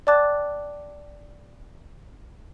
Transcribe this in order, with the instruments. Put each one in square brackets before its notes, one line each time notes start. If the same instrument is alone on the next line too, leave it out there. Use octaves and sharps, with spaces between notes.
[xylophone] D5 G5 A5 D6 F#6 A6